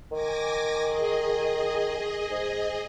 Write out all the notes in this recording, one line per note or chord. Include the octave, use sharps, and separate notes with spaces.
D#3 G#5 D6 A#6
G#4 D#5
G#2